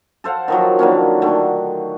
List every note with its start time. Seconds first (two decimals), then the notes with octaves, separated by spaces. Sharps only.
0.24 A4 C5 F5 F#5
0.48 D#3 F3 F#3
0.79 D3 D#3 A#3 C#4
1.22 D3 D#3 A3